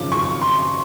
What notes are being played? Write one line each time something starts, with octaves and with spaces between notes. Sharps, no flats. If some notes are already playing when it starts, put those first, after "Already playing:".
Already playing: G#1 F#2 C#3 F3 D6
C#6
C6